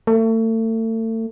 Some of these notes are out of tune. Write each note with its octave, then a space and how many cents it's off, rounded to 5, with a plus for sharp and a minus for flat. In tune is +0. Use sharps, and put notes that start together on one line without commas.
A3 +35